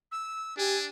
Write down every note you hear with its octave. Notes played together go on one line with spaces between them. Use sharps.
E6
D4 G4 G#5